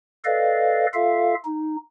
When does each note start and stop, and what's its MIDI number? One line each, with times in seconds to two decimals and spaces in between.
0.25 0.86 69
0.25 0.86 71
0.25 0.86 74
0.25 0.86 75
0.25 0.86 77
0.94 1.35 65
0.94 1.35 69
0.94 1.35 76
0.94 1.35 77
1.45 1.76 63